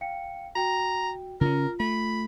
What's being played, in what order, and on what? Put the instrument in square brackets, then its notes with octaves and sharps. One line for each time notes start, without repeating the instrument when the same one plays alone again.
[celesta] F5 G5 C#7
[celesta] F#4 G5 [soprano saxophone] A#5
[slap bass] C#3 C#4 [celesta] F4 [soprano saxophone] A#4
[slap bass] A3 [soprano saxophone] B5